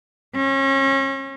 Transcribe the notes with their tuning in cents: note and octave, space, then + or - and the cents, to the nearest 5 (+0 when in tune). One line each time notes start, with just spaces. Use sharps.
C#4 -35